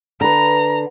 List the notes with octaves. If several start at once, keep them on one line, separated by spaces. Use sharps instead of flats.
D3 B4 A#5